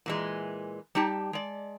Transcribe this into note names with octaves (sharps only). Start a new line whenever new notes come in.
A#2 E3 G#3
G3 D#4 G4 A5
G#3 D5